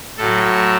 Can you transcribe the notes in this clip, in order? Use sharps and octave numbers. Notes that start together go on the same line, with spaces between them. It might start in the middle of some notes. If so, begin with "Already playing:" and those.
A2 F#3 A4